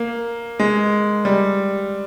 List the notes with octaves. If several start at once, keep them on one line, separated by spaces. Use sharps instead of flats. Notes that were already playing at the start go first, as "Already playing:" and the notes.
Already playing: A#3
G#3
G3